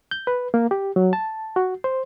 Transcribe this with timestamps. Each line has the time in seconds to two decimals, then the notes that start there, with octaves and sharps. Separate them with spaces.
0.11 G6
0.27 B4
0.54 A#3
0.71 G4
0.96 F#3
1.13 A5
1.56 F#4
1.84 C5